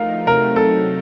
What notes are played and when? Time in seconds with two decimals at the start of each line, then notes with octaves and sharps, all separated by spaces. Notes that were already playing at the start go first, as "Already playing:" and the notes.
Already playing: F3 A3 D#4 A#4 F5
0.26 C3 F#3 A3 C4 D#4 A#4
0.56 A4